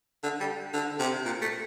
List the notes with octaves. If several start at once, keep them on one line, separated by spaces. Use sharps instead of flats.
D3
G3
D3
C3
A#2
A3